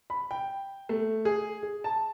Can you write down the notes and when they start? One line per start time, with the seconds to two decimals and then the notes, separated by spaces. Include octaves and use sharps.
0.10 B5
0.31 G5
0.89 A3
1.25 G#4
1.63 G#4
1.84 A5